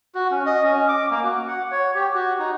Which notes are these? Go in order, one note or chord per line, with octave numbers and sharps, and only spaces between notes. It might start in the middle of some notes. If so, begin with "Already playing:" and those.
F#4
C#4
D#5
C#4
D6
A#3
F#4
F#5
C#5
G4
F#4
D#4